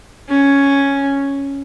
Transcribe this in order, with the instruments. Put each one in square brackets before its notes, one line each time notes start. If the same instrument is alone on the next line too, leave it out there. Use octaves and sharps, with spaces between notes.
[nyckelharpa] C#4